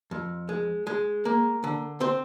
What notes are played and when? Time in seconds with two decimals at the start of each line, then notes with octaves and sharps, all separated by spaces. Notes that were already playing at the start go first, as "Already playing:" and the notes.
0.11 F2
0.49 G#3
0.87 G#3
1.25 A#3
1.64 D3
2.01 C4 C5